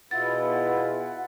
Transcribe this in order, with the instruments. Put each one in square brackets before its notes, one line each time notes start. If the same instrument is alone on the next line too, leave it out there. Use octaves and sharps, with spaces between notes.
[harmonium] B2 E4 F4 [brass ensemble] B3 G#4 B4 [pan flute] F#5 [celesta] A6